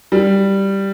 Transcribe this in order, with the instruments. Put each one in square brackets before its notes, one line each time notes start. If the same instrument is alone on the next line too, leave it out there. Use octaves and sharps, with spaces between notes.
[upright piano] G3